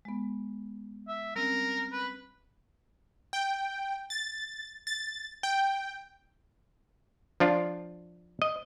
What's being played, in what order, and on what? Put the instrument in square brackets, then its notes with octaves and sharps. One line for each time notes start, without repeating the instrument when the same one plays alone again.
[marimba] G#3 B3
[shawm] E5
[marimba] G3 C4 C#4 [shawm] A#4
[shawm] B4
[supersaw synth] G5
A6
A6
G5
[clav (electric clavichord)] F3 D4 F4
D#5